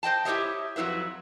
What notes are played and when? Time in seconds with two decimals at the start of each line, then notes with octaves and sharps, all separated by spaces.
0.03 C5 D#5 G5 A5
0.25 E4 G4 A4 C#5 D#5 E5
0.76 F2 F#3 E4 B4 E5